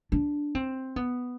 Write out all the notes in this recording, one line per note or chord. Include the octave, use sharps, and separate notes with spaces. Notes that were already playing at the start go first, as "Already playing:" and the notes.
D4
C4
B3